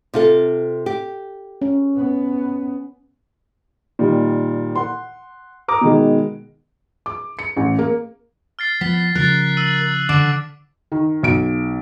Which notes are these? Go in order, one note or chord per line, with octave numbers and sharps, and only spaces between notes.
C3 F4 A4
G4
C#4
B3
A#2 D#3 G3
F#5 C6
A#5 D6 D#6
B2 D#3 G#3
D6
C#7
A1
A#3
F6 A6 C7
F3 B3 B6
C#3 F3 A#4 F#6 A6 C7
E6 D#7 F#7
D3 D6 D7
D#3
B1 D7